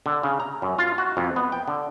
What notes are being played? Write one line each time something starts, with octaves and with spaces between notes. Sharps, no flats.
D3
C#3
A#5
F#2
F4
F#4
F2
B3
G5
D3